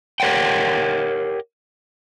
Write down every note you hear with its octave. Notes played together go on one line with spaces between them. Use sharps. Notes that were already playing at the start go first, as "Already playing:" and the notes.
G4 A#4 C#5 F#5 G5